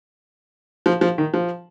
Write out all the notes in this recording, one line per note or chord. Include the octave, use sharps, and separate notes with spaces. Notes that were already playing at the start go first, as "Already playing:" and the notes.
F3
F3
D#3
F3